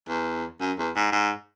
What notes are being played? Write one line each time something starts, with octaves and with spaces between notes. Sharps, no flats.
E2
F#2
E2
G#2
G#2